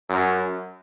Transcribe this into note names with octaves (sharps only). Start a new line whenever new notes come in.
F#2